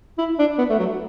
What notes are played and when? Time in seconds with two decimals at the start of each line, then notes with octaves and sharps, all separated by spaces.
0.18 E4
0.39 D4
0.59 B3
0.70 A3
0.79 F#3